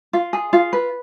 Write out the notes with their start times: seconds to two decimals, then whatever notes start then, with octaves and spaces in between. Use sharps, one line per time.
0.13 F4
0.33 G#4
0.53 F4
0.73 B4